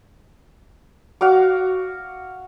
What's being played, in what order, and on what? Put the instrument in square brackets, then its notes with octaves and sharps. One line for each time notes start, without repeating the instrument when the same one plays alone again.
[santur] F#4 F5 D6